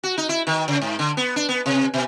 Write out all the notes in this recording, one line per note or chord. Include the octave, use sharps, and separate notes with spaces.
F#4
D#4
E4
D#3
C#3
G#2
D3
B3
D4
B3
C3
B2